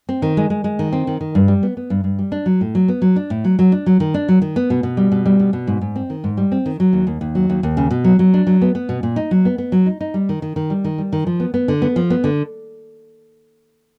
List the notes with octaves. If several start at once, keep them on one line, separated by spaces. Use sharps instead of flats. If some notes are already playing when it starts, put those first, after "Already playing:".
C4
D#3
G#3
G#3
G#3
D#3
C4
D#3
D#3
G2
G3
B3
B3
G2
G2
G3
D4
F#3
A2
F#3
B3
F#3
D4
A2
F#3
F#3
D4
F#3
D#3
D4
F#3
D#3
B3
B2
B2
G3
B2
G3
B2
B2
G#2
G#2
C4
D#3
G#2
G3
C4
D#3
F#3
D#2
D#2
D#2
F#3
D#2
D#2
C#3
B2
F#3
F#3
D4
F#3
B3
B3
B2
A#2
D#4
F#3
B3
B3
F#3
D#4
D#4
G3
D#3
D#3
D#3
G3
D#3
G3
D#3
F3
B3
B3
D3
B3
F3
B3
D3